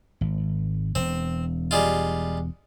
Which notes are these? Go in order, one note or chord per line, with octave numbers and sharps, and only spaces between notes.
G#1
E1 C4
G3 G#3 F4